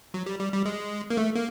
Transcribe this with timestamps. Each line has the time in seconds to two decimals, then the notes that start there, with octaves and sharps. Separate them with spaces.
0.14 F#3
0.26 G3
0.39 G3
0.53 G3
0.65 G#3
1.10 A#3
1.17 A3
1.35 A#3